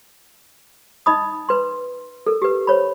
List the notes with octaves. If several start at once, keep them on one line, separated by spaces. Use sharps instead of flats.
D#4 D#5 B5 D#6
B4 C6
A4 A#4
G4 B4
C5 C#5 B5